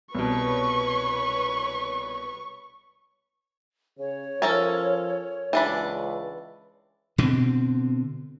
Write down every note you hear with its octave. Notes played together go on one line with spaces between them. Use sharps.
C2 B2 B4 C#5 C#6
C#3 C#5
F3 C#4 A4 A#4
C#2 E3 D4 B5
B2 D3 C4